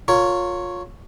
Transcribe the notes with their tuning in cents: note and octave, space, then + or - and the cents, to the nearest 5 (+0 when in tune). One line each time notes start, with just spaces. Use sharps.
F4 +25 A#4 -25 C#5 +5